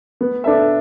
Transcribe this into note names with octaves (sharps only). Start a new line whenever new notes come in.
B3
D4 A4 E5